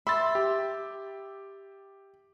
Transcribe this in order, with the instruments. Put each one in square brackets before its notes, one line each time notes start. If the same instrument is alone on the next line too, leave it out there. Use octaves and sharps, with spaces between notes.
[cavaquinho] E5 [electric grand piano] B5 C6 A6
[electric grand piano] G4